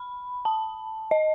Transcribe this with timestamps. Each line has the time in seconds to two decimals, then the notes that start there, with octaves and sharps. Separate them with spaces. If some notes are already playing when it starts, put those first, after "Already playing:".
Already playing: B5
0.45 A5
1.11 D#5